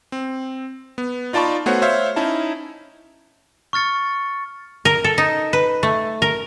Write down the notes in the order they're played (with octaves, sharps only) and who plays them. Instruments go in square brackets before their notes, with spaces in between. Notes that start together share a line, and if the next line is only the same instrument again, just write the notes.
[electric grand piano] C4
B3
D#4 F4 D5 A5 B5 C#6
A3 B3 F#4 C5 C#5 F#5
C5 C#5 E5 F5
C#4 D#4 E4 A5
[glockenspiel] C#6 F6 A6 C#7
[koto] A#4
A4
D#4
B4
A3
A#4